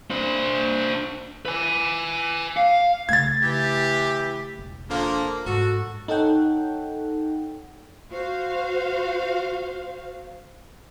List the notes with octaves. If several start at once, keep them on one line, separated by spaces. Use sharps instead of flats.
D4 C5
B4 G#5
F5
C#3 A3 G#6 A6
E3 G4
E1
D3 F3 A#3
G#2 F#4 A4
D#4 A4 C#5 F#5 G5
F#4 C5 F5